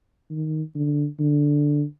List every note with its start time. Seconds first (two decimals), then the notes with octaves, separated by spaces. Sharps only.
0.30 D#3
0.75 D3
1.19 D3